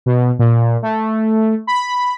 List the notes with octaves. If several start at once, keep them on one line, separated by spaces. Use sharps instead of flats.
B2
A#2
A3
B5